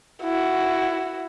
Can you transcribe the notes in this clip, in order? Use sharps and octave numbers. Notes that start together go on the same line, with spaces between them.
E4 F#4